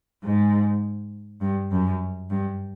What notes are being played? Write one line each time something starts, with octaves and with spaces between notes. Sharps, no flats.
G#2
G2
F#2
G2